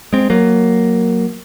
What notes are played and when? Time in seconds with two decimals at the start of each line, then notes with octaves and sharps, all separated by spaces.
0.13 G#3 C4
0.30 F#3 A#3